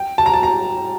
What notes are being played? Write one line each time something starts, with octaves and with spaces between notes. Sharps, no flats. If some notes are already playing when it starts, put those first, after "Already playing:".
Already playing: G5
A5
A#5
A5
A#5